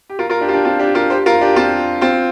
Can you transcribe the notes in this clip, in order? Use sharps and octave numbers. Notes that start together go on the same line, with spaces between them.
G4
F4 A#4
F4 A#4
D4 G4
F4
D4 G4
C4 F4
D4 G4
F4 A#4
G4 C5
F4 A#4
D4 G4
C4 F4
C4 F4